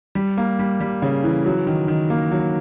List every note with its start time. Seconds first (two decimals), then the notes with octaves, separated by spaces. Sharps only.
0.15 G3
0.38 A#3
0.59 G3
0.80 G3
1.02 C#3
1.24 E3
1.46 F#3
1.67 D#3
1.88 D#3
2.10 A#3
2.31 F#3